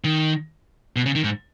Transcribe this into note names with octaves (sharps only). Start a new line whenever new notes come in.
D#3
B2
C#3
D#3
G#2